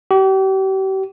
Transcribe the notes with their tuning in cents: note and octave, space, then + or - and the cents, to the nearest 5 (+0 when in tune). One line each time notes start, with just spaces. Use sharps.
G4 -40